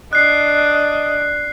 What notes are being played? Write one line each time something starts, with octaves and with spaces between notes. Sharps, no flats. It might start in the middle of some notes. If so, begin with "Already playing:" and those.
D4 D#5 F#6 C7